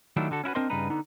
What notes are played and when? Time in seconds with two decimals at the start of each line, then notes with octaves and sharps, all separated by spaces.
0.17 D#3 F#3 A3 D4 E4 F4
0.31 D3 F#4 A4
0.44 C#4 E4 F#4 B4
0.55 C4 D4 A#4 C5 D#5 C6
0.70 G2 C#3 G3 D#4 B4 A#5
0.90 D3 B3 D#4